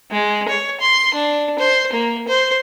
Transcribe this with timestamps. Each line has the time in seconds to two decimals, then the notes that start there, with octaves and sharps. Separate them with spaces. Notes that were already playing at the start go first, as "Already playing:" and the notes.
0.11 G#3
0.48 C#5
0.80 C6
1.14 D4
1.59 C5
1.93 A#3
2.28 C5